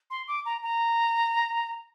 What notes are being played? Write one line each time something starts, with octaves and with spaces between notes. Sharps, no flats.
C6
D6
A#5
A#5